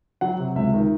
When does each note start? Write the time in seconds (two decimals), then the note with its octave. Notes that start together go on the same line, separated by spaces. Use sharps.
0.21 F#3 F#5
0.39 C3
0.56 C#2 E5
0.74 D#3